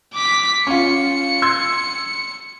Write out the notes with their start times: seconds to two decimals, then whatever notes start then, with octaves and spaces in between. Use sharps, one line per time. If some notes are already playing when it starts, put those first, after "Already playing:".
0.14 D6 B6
0.67 C#4 F4 C#7
1.42 C6 E6 G#6